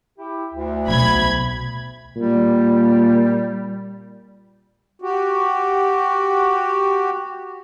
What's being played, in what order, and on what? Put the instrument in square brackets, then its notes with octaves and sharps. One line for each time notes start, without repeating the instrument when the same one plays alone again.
[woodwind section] E4 G4
D2
[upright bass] B1 B2 [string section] B5 G#6
[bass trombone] A#2 [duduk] G3
[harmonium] F#4 G4